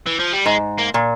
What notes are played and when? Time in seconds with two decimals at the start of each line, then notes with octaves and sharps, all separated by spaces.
0.06 E3
0.19 F3
0.33 G3
0.46 G#2 G#3
0.78 A#3
0.94 A#2